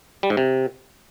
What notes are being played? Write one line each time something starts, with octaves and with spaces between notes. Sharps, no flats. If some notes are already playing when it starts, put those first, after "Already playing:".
G3
G#2
C3